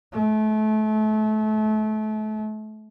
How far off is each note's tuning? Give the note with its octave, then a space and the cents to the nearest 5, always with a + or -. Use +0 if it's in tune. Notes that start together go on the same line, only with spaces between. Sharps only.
A3 -30